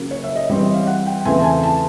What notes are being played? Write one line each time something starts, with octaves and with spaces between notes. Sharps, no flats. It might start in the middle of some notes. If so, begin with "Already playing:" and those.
Already playing: C#3 F#3 A#3
C#5
E5
D#5
E3 G3 C4 C#5
D#5
F5
F#5
G5
E2 C#3 E3 A3 C4 G#5
A5
G#5
A5